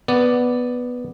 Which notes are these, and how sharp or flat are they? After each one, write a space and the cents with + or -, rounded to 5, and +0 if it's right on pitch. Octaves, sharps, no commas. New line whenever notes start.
B3 +0 D5 +0